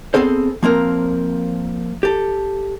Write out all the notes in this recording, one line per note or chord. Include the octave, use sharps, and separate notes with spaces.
B3 C4 G#4 A4 C5
F3 A#3 C4 A#4
G4 A4